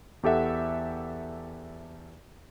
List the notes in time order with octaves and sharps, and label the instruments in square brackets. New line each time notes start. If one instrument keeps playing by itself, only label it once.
[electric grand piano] E2 G4 A4 E5 F#5